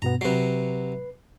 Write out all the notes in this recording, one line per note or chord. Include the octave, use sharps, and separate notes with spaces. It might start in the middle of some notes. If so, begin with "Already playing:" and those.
G2 B2 B3 A#5
C3 F#3 B4 C7